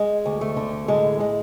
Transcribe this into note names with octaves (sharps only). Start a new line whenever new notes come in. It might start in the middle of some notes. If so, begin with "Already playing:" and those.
Already playing: G#3
D2
A3
D3
A2 G#3
G#3